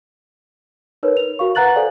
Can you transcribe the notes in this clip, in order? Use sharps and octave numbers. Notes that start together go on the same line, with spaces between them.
D#4 A#4 B4 C#5
F7
F#4 A#4 F5 C#6
B4 F#5 A#5 F#6 A6 F#7
A4 C5 D5 F5 G#5